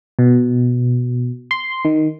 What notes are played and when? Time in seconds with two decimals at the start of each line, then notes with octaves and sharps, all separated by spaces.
0.19 B2
1.51 C6
1.85 D#3